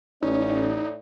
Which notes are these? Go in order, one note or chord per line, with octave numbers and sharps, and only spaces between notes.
A1 A2 A3 C#4 D#4 D5